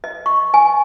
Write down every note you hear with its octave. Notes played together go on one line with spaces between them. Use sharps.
D#5
C#6
G#5